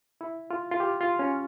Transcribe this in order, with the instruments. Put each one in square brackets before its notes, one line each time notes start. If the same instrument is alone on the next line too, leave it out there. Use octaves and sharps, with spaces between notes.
[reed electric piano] E4
F4
F4
G4
F4
C#4